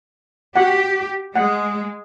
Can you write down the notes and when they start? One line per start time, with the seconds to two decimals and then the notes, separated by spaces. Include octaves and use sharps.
0.56 F#4 G4 F#5
1.35 G#3 F#5